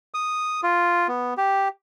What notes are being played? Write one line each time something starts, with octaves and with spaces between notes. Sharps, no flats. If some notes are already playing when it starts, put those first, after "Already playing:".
D#6
F4
B3
G4